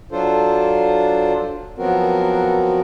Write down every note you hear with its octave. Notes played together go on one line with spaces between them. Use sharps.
F#3 D4 F4 A4 C5
F3 F#3 B3 C4 F#4 A#4